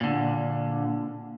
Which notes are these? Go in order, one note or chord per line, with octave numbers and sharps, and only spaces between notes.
A#2 D3